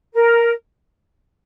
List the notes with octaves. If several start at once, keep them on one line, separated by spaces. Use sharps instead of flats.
A#4